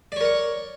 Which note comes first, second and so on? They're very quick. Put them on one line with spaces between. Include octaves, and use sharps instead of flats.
D5 C#5 A#4 C#6